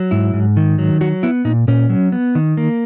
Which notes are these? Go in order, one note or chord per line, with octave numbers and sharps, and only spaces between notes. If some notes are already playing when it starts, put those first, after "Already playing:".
Already playing: F#3
G#2 E4
G#2
D#3
F#3
F#3 F#4
B3 E4
A#2 D#4
A#2 C#4
F#3
B3
D#3
A#3